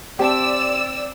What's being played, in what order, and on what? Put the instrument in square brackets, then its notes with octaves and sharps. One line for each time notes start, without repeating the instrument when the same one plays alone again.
[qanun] C4 E5 [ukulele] G4 A5 [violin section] D5 E6